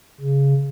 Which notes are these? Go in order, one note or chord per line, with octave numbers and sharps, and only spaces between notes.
C#3